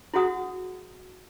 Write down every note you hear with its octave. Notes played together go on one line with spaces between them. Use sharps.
E4 F#4 G#4 F#5 D#6